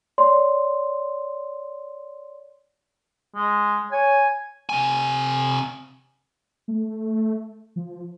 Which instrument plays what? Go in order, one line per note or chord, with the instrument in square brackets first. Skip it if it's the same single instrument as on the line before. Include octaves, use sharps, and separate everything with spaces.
[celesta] C#5 D5 C6
[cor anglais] G#3
[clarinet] C#5 [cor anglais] G#5
[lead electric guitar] C3 G#5
[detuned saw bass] A3
F3